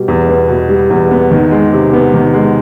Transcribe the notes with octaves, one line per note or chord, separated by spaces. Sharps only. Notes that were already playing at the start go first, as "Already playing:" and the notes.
Already playing: B2 G3
E2
B3
B2
G3
E2
B3
D#3
G#3
C3
B3
D#3
G#3